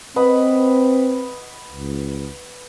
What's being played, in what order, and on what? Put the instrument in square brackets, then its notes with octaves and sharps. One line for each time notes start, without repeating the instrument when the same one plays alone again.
[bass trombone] C4 [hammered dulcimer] B4 D#5 F#5
[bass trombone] C#2